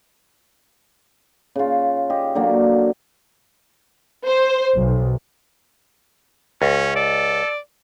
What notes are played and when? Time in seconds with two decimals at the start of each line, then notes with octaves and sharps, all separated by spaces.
1.55 C#3 F4
2.10 G4 D#5
2.35 D3 F#3 A#3
4.27 C5
4.77 B1
6.62 C#2 C#4
6.96 A4 D5